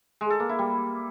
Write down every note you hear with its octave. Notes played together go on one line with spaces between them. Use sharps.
G#3
A4
A#3
E4
G3